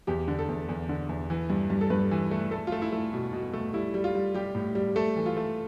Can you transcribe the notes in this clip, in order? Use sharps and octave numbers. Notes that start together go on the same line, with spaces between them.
E2 G4
D3
A4
E2
E2
D3
E2
E3
G2
G2
A4
G2 B4
E3
A3
A3 A4
F4
A3
E4
A3
B2
B2
A3
G3 E4
G3
F4
G3
G3 G4
A2
G3
A3 A4
E3
F4
A3